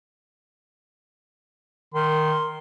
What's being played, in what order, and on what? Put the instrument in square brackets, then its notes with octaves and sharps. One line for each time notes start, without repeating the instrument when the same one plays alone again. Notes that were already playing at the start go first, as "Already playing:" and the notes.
[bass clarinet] D#3 [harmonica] C6